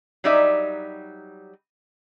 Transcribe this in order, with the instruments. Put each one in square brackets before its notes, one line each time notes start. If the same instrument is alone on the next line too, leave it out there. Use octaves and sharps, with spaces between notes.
[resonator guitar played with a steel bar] F#3 G3 D#4 D5 E5